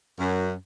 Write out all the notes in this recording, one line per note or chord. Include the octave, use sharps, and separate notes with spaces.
F#2